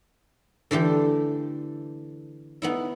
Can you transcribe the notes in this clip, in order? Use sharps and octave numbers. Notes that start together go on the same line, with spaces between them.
D3 E3 A3 G4
B3 D#4 E4